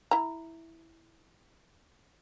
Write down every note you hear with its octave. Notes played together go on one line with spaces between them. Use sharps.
E4 A#5